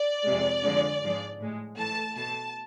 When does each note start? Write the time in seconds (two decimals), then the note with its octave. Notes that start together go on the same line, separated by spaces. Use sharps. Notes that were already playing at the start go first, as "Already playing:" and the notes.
Already playing: D5
0.25 F2 C3 G#3
0.63 F2 D3 F3 G#3
1.02 G#2 F3 G#3
1.39 A2 G#3
1.77 A2 E3 A3 A5
2.15 B2 A3 A5